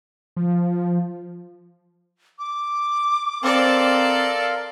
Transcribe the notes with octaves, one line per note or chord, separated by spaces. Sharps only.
F3
D6
C4 A4 A#4 D5 F5 C6